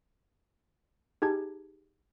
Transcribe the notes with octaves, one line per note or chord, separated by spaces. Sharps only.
D#4 G4 G#4 A5 G#6